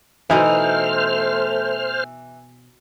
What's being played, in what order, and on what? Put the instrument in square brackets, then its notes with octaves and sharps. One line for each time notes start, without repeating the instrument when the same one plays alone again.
[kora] B2 D#4 E4 [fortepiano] E3 [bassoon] A3 [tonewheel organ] C5 F6